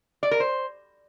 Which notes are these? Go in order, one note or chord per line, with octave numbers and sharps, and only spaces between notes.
D5
A#4
C5